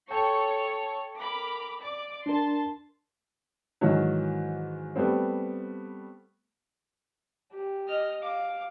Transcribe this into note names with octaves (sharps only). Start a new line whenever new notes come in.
A4 C#5 G5 A5 C#6
A#4 B5 D6
D5 D6
D4 A#4 A5 C6
G#2 D#3 E3 F#3
G3 A3 B3 C4
G4
D#5 F6
F5 D6